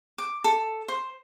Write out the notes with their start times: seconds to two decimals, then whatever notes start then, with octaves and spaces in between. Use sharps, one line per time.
0.18 D6
0.44 A4
0.88 C5